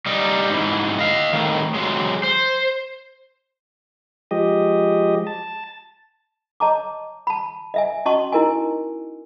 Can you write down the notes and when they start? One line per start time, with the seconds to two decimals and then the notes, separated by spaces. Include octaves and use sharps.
0.06 G3 D#4
0.50 G#2 E3
0.99 D#5 F5
1.33 A2 D#3
1.74 F#3 G#3
2.24 C5
4.31 F3 G#3 G4 D#5
5.27 A5
6.60 C#5 D#5 A5 A#5 D6
7.27 A5 B5
7.74 D#5 E5 G#5
8.05 C#4 F#4 D#5 A5 C6 C#6
8.32 D#4 E4 A#4 D#5 G#5